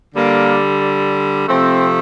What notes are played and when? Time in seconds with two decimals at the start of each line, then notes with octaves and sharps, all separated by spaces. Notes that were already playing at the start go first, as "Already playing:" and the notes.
0.15 D3 G3 A#3
1.47 C3 F3 A3 C4